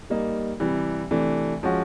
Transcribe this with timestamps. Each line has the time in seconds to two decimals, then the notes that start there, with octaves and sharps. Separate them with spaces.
0.10 G3 A#3 D#4
0.60 C3 E3 G3
1.11 C3 E3 A3 D4
1.63 F3 G#3 C#4 F#4